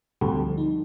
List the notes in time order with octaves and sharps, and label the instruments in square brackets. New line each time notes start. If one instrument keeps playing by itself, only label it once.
[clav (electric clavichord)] D2 D3 G3 [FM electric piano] C4
[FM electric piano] F3
D#4